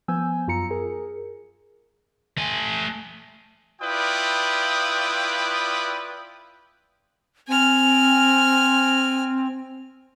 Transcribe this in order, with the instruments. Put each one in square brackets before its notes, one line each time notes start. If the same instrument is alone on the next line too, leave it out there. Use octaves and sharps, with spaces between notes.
[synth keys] F3 B3 G#5 E6 G6
F#2 F4 A#5 C#7
G#4 A#4
[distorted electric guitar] A3 G#5
[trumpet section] E4 F4 B4 D5 G5 D#6
[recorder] C4 [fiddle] G#5 F6